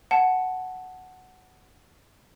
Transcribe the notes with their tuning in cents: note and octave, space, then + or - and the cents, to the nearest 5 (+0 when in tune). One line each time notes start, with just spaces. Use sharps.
F#5 +0 A5 -10